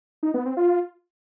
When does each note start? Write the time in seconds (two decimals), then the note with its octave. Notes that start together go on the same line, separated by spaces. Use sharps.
0.23 D#4
0.34 B3
0.45 C4
0.57 F4